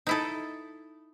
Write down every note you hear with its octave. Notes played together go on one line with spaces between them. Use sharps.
D#4 E4 A4